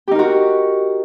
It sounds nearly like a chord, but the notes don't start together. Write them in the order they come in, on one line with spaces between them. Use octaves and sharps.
G4 D#4 A#4 F#4